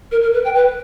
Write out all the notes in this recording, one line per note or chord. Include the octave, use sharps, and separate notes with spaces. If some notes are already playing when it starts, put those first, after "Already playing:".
A#4
A#4
B4
G5
B4